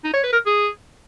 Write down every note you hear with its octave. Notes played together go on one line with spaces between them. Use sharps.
D#4
C#5
B4
A#4
G#4